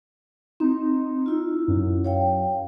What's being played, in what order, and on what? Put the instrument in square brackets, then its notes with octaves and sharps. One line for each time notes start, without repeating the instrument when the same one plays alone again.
[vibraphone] C4 [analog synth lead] D#4
[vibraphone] E4 F4
[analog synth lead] F#2
[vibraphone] C#5 F5 G5